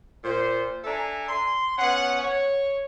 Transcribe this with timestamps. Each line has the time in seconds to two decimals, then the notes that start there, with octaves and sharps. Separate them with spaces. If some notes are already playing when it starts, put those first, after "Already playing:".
0.23 A#2 C5
0.84 D4 A4 E5 G#5 A#5
1.28 C6
1.78 B3 C#4 F#5
2.21 C#5